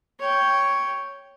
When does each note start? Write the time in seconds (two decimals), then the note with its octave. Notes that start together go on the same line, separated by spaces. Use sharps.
0.20 C#5 G5